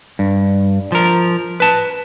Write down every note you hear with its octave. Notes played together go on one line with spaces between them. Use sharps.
G2
F3 A#4
B4 A5